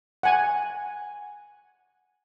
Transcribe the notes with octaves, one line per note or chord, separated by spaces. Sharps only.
F#5 G#5